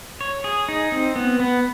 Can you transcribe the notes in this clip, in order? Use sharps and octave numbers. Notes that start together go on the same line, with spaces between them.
C#5
G#4
D#4
C4
B3
B3